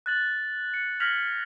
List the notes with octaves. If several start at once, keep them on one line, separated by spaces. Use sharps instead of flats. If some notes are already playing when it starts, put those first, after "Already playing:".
F#6 A6 F#7
C#7
F6 G#6 A#6 B6 F7 F#7